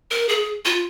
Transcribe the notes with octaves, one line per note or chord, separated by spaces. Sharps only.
A#4
G#4
F4